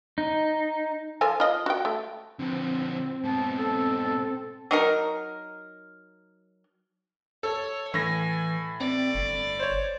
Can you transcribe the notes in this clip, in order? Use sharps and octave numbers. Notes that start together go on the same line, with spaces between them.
D#4
F3 A4 G#5
F4 D#5
F#4 G5
A3
D3 F3 C4
G#2 B2 A5
A4
F#3 D#4 A#4
A4 C#5
A2 E3 G#5 A#6
C4 D5
G1
C5 C#5